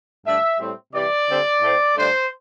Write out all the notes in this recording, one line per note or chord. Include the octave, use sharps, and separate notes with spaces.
G2 D3 A3 D4 E5
A2 G3 C4
C3 E3 G3 D5
D3 G3 C4
A2 A3 C4
G2 D3 A3 D4 C5